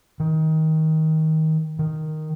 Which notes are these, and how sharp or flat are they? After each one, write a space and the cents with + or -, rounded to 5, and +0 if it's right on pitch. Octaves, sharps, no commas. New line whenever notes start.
D#3 +20
D#3 +0